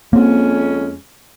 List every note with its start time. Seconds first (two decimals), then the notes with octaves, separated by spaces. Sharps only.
0.13 F2 G#3 A#3 C4 C#4